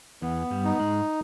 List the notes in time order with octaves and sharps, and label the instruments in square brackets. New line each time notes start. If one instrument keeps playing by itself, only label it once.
[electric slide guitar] E2 E3 [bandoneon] B3
[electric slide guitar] G2 G3
[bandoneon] D#4
[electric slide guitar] G#2 G#3